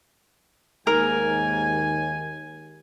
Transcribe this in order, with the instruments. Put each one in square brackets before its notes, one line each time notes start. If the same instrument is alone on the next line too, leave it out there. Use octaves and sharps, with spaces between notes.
[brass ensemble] D#2 [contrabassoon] G#2 [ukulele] A#4 [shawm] G#5